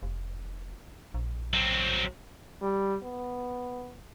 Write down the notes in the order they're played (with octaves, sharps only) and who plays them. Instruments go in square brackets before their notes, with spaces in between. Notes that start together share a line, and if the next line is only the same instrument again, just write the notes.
[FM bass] F1
A#1
[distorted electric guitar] F#3 C4
[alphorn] G3
B3